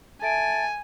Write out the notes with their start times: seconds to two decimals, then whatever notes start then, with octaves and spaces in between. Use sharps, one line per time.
0.22 A4 E5 G#5 A5 D7